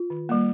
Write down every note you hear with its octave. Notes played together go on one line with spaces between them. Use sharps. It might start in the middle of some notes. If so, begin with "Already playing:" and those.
Already playing: F4
D#3
G3 A#3